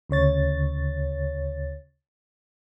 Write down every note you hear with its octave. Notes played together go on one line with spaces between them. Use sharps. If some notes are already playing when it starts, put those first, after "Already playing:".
D2 C#3 C#5 A6